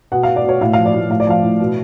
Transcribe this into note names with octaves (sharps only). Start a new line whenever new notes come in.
B2 F#5
B2 F5
D5
B2 C#5
A2 F5
F3 F5
D5
A2
A2 F5
D5
F3 F5
A2
B2